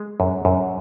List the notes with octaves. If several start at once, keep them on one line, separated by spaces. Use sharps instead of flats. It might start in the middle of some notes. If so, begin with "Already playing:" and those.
Already playing: G#3
F#2
F#2